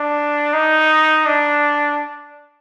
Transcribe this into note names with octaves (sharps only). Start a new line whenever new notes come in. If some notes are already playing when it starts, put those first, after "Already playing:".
Already playing: D4
D#4
D4